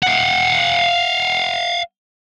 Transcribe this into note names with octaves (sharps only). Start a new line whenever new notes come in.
F5 F#5